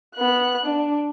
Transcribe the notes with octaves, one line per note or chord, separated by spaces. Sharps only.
B3 F#6
D4